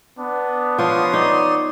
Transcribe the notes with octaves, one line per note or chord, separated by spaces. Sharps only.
B3 D4
F3 F4 C#5 C6 D#6
D#4 D5